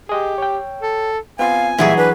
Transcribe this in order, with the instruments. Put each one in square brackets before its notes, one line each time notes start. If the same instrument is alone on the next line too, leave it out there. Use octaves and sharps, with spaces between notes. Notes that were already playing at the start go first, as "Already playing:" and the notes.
[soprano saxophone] G4 [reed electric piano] G#4 D#5
[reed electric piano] C#5 G5
[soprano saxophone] A4
[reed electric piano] B3 C4 F4 [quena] F5 [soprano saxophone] G#5
[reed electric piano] A#2 G3 A#3 [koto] E3 F#3 G#4 [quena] E5
[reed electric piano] D4 [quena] B4